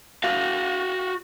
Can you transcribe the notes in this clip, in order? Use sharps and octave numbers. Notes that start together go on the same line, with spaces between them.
F#4 F5